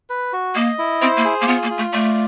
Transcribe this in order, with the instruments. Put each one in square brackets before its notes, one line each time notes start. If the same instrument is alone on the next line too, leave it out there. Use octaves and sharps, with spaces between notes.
[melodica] B4
F#4
[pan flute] A#3 [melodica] D#5
[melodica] E4
[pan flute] C4 [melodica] C5
[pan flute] A#3
[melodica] G#4
[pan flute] A#3
[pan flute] B3 [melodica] F4
[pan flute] A#3
[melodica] F4
[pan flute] A3
[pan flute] A3 [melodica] D5